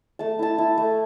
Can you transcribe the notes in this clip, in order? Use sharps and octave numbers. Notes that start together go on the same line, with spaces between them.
A3 A5
E4 A5
E4
A3